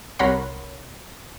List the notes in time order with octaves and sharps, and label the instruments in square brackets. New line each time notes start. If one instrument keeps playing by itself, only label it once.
[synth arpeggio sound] C2 A#4 C#5 F#5 B5 C6